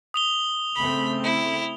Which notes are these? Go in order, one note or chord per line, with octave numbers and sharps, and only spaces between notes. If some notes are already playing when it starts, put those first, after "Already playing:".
D#6 F7 G7
C#3 A3 C4 B5
E4